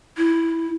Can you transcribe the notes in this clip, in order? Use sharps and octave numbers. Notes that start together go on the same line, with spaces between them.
E4